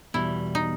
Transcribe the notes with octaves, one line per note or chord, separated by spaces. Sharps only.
E2 B2 G3 E4
D#4